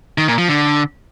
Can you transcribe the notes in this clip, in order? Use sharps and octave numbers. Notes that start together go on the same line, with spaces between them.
D#3
A#2
F3
D3